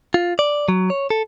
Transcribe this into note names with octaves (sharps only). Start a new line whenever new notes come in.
F4
D5
F#3
C#5
A4